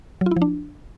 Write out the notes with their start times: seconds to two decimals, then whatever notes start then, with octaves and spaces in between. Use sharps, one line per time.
0.21 F#3
0.26 F4
0.31 E4
0.37 F3
0.42 D4